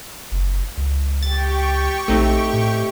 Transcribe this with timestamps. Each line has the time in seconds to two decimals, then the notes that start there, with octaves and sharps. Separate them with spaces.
0.31 F#1
0.77 C#2
1.23 G4 G5 C#6 A6
2.08 A#1 A3 C4 D#4
2.53 A2